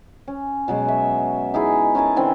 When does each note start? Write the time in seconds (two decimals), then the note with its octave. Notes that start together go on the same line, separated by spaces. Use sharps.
0.28 C#4
0.68 B2 F#3 G#3
0.88 E5
1.54 D#4 E4 G#4
1.95 C#4 A#4 G#5 A5
2.16 D3 E3 C4 A#4